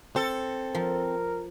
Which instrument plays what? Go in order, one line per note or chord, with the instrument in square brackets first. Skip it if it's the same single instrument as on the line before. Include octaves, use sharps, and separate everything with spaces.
[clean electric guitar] C4 [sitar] A4
[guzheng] F3 [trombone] A#4